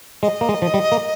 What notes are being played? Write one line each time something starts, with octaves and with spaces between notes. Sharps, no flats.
G#3 D#5
A#3
G#3
F3
G3
A#3